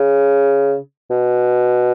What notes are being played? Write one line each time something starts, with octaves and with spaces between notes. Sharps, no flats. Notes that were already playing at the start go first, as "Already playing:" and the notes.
Already playing: C#3
B2